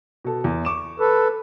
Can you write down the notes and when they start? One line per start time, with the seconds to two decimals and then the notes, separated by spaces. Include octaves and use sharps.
0.25 B2 A4
0.44 E2
0.65 C#6 D6 E7
1.00 A4 B4